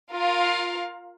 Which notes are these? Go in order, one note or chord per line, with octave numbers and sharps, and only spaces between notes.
F4 A#4 F5